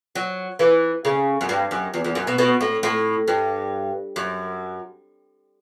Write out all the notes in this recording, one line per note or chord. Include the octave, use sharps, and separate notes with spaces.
F#3
E3
C#3
F#2
G2
F#2
E2
E2
F#2
B2
B2
A2
A2
G2
F#2